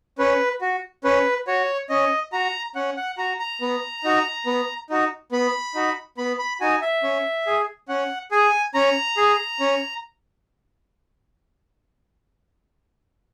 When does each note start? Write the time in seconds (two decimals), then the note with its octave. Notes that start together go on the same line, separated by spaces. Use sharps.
0.18 C#4 B4
0.61 F#4
1.04 C#4 B4
1.47 F#4 C#5
1.89 C#4 D#5
2.33 F#4 A#5
2.75 C#4 F#5
2.97 F#5
3.18 F#4 A#5
3.39 A#5
3.61 B3
4.04 D#4 F#4
4.46 B3
4.90 D#4 F#4
5.32 B3 B5
5.75 D#4 F#4
6.18 B3 B5
6.39 B5
6.61 D#4 F#4 G#5
6.82 E5
7.03 C#4
7.47 G#4
7.89 C#4 F#5
8.31 G#4 G#5
8.74 C#4 A#5
9.17 G#4
9.60 C#4